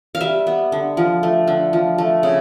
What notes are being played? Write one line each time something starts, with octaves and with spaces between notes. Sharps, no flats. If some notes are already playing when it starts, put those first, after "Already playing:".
F5
G3 E5
B3
D3
F3
A3
D3
F3
A3
C#3